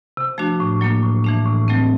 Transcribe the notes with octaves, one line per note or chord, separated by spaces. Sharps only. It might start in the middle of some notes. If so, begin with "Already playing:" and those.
C3
F3 A3 D4 F#4
A2
F#3 A#3 D4
A2
E3 A3 D4
A2
F#3 A3 C4